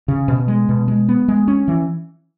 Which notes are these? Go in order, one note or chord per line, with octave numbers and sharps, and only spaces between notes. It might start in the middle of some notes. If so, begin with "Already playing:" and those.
C#3
B2
G#3
B2
G#3
B3
G#3
C#4
E3